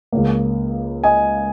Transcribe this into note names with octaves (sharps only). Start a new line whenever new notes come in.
C#2 C#3 A#3
D#5 G#5